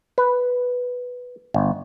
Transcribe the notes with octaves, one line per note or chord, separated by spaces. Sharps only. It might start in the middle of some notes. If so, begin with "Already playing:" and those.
B4
G1